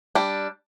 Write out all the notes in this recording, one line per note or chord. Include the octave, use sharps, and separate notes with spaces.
G3 D4